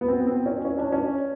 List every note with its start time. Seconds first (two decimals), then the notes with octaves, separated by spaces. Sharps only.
0.01 B3
0.08 C4
0.20 B3
0.27 C4
0.46 C#4
0.65 C#4
0.78 D4
0.92 C#4